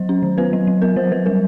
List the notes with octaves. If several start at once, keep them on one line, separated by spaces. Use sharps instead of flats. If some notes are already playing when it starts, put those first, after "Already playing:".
Already playing: F#3 C5
C#4
D#3
B3 B4
F#3
F#3
B3 A#4
F#3 C5
F#3 B4
G3 A#4